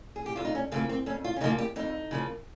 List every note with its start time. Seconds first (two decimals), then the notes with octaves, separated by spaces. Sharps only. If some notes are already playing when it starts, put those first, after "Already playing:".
0.16 G#4
0.26 G4
0.36 F2 F4
0.45 D#4
0.55 C#4
0.72 C#3 F3 A#3 C4
0.89 C4
1.06 F2 C#4
1.24 F4
1.36 C#4
1.41 C#3 F3 A#3 D#4
1.58 G4
1.76 F2 D#4
2.11 C#3 F3 A#3